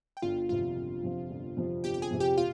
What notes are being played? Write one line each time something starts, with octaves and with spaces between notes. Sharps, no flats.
G5
G1 F4 F5
F2 C3 F3 F4 F5
G1
F2 C3 F3
G1
F2 C3 F3
G1 G4 G5
G5
G#4 G#5
F2 C3 F3
G4 G5
A#2 F4 F5